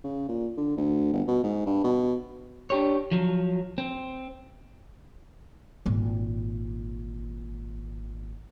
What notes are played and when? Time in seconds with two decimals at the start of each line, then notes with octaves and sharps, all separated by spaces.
0.04 C#3
0.28 A#2
0.57 D3
0.77 D2
1.13 G1
1.28 B2
1.44 G#2
1.66 G2
1.84 B2
2.70 D4 G4 C#5
3.11 F3 F#3
3.78 C4
5.86 G#1 A#2